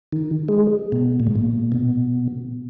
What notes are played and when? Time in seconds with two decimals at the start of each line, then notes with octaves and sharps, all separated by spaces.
0.12 D#3
0.48 G#3
0.92 B2
1.20 A#2
1.27 G#2
1.35 A#2
1.72 B2